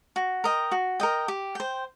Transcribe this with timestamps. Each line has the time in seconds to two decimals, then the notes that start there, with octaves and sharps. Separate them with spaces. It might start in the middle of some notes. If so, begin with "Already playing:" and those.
0.16 F#4
0.44 A#4 D#5 G5
0.72 F#4
1.00 A#4 D#5 G5
1.28 G4
1.55 C5 G5